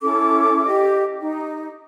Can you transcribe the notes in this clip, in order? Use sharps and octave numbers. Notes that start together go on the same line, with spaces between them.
C#4 E4 A4 D6
G4 D#5
D#4